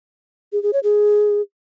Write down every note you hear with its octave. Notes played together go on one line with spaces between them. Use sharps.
G#4
G#4
C#5
G#4